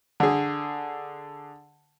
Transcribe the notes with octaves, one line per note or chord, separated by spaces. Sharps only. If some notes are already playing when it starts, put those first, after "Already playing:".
D3 G#4